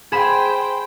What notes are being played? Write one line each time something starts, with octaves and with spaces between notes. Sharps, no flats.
G#4 C5 G5 B5 E7